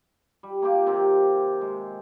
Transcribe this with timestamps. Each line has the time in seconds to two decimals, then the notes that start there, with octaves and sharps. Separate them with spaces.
0.43 G3
0.62 A#3 F4 G4
0.87 C3 D#3 C4 G4
1.61 G#3